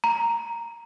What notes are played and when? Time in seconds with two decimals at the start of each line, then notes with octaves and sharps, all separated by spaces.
0.04 A#5